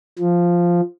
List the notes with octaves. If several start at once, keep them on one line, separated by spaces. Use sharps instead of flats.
F3